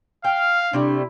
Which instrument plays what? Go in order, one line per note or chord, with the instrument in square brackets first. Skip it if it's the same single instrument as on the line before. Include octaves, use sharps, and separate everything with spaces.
[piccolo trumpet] F5 [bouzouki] G5 [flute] F6
[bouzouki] C3 G3 A3 [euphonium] D4 [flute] E4